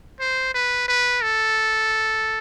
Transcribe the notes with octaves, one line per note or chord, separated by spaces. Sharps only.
C5
B4
B4
A4